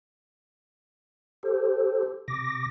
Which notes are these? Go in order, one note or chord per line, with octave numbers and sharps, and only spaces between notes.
G4 A4 C5
C3 D6 A#6